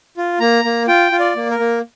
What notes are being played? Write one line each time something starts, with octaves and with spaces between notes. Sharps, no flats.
F4
A#3 A#5
A#3
F4 G5
F4
D5
A#3
A#4
A#3